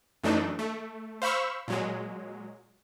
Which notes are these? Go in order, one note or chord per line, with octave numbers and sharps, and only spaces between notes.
F#2 E3 A3 D4 D#4
A3
C5 F5 B5 C#6 E6
A#2 F#3 G#3